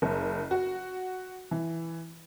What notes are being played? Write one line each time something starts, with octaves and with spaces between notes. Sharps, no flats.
F#1
F#4
E3